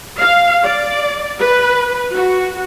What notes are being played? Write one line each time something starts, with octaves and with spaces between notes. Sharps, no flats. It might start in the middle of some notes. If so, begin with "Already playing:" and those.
F5
D5
B4
F#4